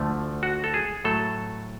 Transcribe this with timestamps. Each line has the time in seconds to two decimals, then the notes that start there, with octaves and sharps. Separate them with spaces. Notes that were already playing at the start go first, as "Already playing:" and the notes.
Already playing: D2 D3 F3 A3
0.43 F#4
0.64 A4
0.74 G#4
1.04 A2 F#3 A3 A4